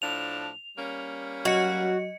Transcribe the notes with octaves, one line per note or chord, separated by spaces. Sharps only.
A2 F3 D4 F7
G3 A#3 C#4
F#3 F#4 D#5 C#7